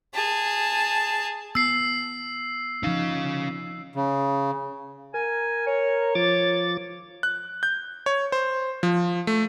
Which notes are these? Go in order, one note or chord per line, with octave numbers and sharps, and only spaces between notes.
G#4 A5
B3 E6 C7
F3 C#4 D#4 F5
C#3
A#4 G#5
C#5
F3 D6 A6
F#6
G6
C#5
C5
F3
A3